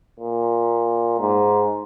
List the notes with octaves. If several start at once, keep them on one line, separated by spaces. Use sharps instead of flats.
A#2
G#2